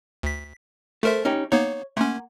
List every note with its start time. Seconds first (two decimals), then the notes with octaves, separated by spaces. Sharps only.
0.23 D2 B6
1.03 A3 A4 A#4 C5 E5
1.25 C#4 D#4 G4
1.52 A#3 B3 D#4 C#5
1.97 A3 A#3 C#4 F#5 C6